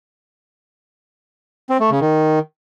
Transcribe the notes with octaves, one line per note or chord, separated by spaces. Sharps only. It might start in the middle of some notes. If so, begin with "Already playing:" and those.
C4
A3
C#3
D#3